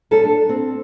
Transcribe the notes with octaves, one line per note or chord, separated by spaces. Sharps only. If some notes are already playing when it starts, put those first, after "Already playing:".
G3 C#4 A4
D4
C4